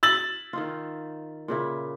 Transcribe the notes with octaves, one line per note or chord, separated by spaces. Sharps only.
E6 A6 F#7
D#3 D#4 F4
A#2 C#3 E4